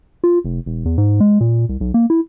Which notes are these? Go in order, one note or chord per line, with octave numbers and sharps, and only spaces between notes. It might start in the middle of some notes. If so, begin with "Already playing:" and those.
F4
F1
E1
E2
G#2
G#3
A#2
C2
B1
A#3
E4